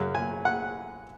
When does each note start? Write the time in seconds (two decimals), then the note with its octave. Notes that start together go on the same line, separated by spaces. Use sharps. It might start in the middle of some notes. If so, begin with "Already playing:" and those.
Already playing: F#2 C#3 F#3
0.15 G#5
0.45 F#5